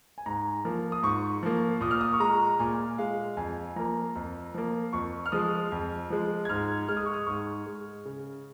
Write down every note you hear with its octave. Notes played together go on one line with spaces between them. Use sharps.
G#5
G#2 A#5
F3 A#3
D#6
G#2 C#6
F3 A#3
A#2 D#6
F6
D#6
C#6
G#3 A#5
A#2 G#5
G#3 F5
F2 G#5
F3 A#3 A#5
F2
F3 A#3
F2 C#6
F6
F3 G#3 D#6
F2
F3 G#3
G#6
G#2 F6
G#3 F6
D#6
C#6
D#6
G#2 C#6
G#3
C#3